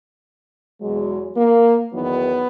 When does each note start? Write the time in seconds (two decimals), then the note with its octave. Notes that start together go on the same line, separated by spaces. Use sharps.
0.81 E2 B2 F#3 G#3
1.37 A#3
1.93 E2 D#3 F#3 B3